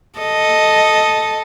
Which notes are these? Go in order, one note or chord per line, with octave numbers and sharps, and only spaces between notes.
A4 D#5